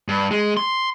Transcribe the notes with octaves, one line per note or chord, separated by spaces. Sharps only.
G2
G#3
C6